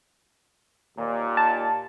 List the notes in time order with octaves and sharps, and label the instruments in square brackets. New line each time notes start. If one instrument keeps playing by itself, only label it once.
[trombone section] D#2 A#2
[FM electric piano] A5